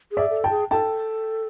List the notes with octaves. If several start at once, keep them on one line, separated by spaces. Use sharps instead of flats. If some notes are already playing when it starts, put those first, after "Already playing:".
G#4
D5 E5
A4
G5 A5
G#4
A4 G5 A5